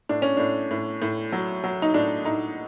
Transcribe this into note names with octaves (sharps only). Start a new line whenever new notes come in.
A2 D4
C#4
A2 D4
A2
A2
F#3
F#3
D#4
A2 D4
A2 D#4